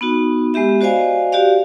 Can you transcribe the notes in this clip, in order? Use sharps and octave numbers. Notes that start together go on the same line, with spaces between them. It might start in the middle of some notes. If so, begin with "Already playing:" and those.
B3 D#4 F#4
G#3 B3 G4 E5
F#4 C5 D5 D#5 F5 G#5
F#4 G4 D5 F5